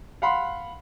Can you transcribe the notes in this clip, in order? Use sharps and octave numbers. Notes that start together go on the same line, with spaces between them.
F5 F#5 B5 C6